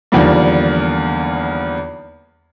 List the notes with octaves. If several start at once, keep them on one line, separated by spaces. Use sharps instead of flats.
E2 D3 D#3 F3 G3 A#3